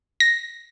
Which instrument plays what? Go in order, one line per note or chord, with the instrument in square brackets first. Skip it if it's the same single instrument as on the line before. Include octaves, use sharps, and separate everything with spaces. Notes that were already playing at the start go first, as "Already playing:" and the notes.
[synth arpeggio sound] A#6